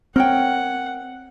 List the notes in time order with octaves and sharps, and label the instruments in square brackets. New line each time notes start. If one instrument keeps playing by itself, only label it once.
[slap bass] C4 [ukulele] A#4 C#5 G5 [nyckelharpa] F#5